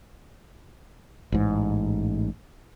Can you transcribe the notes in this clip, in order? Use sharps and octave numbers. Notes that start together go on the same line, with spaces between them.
A1 G#2